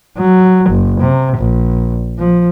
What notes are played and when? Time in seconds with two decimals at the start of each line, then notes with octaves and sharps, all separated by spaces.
0.17 F#3
0.70 F#1
1.00 C3
1.37 A#1
2.18 F3